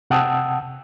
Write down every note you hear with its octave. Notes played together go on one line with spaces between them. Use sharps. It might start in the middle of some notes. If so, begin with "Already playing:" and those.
C3 F#5 G5 A5 D#6 E6